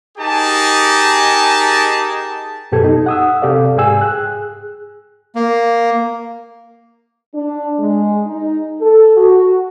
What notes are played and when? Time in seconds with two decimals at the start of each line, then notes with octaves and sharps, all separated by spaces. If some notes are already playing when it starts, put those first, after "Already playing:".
0.18 D#4 G4 G#4 A#4 G#5 A5
2.72 F#2 B2 G4 A4 G#6
2.84 D#4
3.06 F#5 D#6 E6
3.42 C3 G4 A4 D5 F5
3.77 G#2 G#4 G5 G#5 E6
4.01 G#4 F#6
5.35 A#3
7.34 D4
7.80 G#3
8.27 D#4
8.81 A4
9.17 F#4